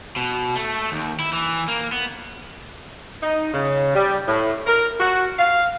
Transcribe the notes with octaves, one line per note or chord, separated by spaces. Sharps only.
B2
A3
D#2
E4
E3
A#3
B3
D#4
C#3
G3
A2
A#4
F#4
F5